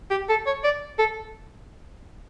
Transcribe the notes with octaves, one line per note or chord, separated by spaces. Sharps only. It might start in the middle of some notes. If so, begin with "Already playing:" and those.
G4
A4
C#5
D5
A4